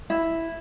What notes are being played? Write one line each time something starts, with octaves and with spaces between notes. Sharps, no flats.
E4